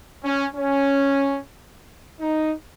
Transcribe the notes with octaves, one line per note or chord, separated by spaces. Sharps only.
C#4
C#4
D#4